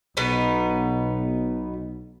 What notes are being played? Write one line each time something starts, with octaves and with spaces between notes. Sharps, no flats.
B1 B2 B3 D#4